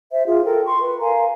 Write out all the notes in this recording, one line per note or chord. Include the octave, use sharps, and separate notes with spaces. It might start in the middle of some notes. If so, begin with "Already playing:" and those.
C5 E5
F4 G#4
A4 A#4 G5
C6 C#6
B4
A#4 F5 G#5 A#5